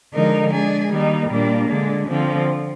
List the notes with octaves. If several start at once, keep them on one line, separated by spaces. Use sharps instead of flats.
D3 F3 G#3 D#4 A#4
G#3 D4 G#4
D#3 G3 A#3 D#4
A#2 G3 A#3 D4
D3 G#3 D4
D3 F3 C4